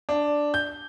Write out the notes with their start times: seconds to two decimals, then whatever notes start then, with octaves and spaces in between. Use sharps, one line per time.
0.09 D4
0.54 G6